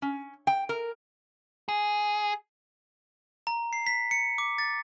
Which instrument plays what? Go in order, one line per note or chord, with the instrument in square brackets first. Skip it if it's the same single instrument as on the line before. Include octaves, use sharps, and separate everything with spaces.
[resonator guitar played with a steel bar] C#4
G5
A#4
[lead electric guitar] G#4
[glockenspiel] A#5
C7
B6
C#7
D6
A6